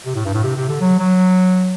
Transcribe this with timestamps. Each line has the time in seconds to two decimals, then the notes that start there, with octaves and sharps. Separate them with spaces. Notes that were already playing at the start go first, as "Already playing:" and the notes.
0.06 C3
0.15 A2
0.25 G2
0.34 A2
0.44 C3
0.56 C3
0.69 D3
0.81 F#3
0.99 F#3